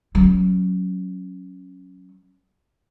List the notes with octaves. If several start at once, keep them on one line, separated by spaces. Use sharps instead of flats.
F#3 C#4